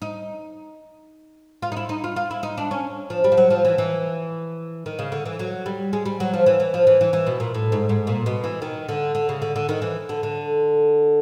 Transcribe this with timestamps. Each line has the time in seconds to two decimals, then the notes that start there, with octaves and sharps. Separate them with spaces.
0.02 D#4
1.62 F4
1.72 D#4
1.77 E4
1.89 D#4
2.04 F4
2.16 F4
2.31 E4
2.43 D#4
2.58 D4
2.71 C#4
3.10 F3
3.24 G3
3.32 F3
3.37 F#3
3.50 F3
3.65 E3
3.78 E3
4.86 D#3
4.99 C#3
5.12 D3
5.26 E3
5.39 F#3
5.66 G3
5.93 G#3
6.06 G3
6.20 F#3
6.34 F3
6.46 E3
6.60 E3
6.74 F3
6.87 E3
7.01 E3
7.13 E3
7.27 B2
7.40 A#2
7.54 A2
7.72 G#2
7.89 G#2
8.07 A#2
8.26 B2
8.44 E3
8.62 D#3
8.89 D3
9.15 D3
9.29 C#3
9.42 D3
9.56 D3
9.69 D#3
9.82 E3
10.09 D3
10.23 D3